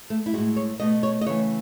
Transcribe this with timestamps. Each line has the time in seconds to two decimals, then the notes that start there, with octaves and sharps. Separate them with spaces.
0.10 A3
0.26 E4
0.33 G#3 F#4
0.38 A2
0.56 C#5
0.80 B2 A3 D#5
1.03 C#5
1.21 D#5
1.26 C#3 E3 A3 C#5